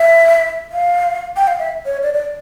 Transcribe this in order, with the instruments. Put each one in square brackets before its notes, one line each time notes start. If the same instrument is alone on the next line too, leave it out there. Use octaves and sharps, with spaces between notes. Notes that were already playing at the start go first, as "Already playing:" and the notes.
Already playing: [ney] E5
F5
G5
F5
E5
C#5
D5
D5